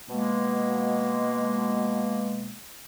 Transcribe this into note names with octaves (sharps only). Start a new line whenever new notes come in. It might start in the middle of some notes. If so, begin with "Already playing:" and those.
B2 G#3 A#3